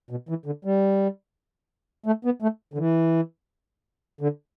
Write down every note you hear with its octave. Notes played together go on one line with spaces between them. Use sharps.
B2
E3
D3
G3
A3
B3
A3
D3
E3
D3